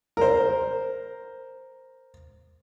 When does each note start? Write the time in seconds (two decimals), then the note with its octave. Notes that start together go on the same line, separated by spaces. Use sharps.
0.17 A#4 C5